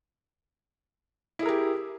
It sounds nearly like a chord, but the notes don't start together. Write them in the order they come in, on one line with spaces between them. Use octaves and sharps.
E4 G#4 A#4 G4